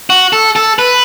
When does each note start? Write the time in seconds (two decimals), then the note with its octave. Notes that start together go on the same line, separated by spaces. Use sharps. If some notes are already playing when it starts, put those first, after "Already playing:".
0.10 F#4
0.33 A4
0.56 A4
0.79 B4